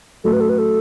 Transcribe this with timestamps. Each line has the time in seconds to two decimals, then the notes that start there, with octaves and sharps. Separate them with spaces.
0.24 A1 A2 F#3 A4
0.33 B4
0.41 A4
0.49 B4
0.58 A4